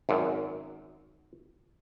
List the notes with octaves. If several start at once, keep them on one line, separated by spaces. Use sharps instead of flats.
G#1 F#2